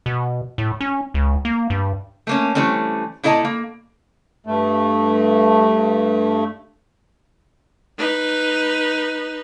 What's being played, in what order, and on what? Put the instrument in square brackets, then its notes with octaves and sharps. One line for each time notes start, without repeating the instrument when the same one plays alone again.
[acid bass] B2
A2
C#4
C#2
A#3
G2
[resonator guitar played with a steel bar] A3 A#3 C#4
E3 G3 A3 C4 C#4
A#2 E4 A4 D#5 A5 A#5
A#3
[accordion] G2 A3
[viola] D#4 B4